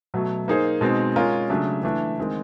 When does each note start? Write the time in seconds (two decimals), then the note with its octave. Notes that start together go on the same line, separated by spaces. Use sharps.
0.14 B2 F#3 A3
0.48 A#3 D#4 G#4 C5
0.81 B2 G#3 C4 D#4
1.16 G#3 C#4 F4 A#4
1.50 C#3 F#3 A3 D4
1.83 E3 A3 D4
2.19 D#3 G#3 C4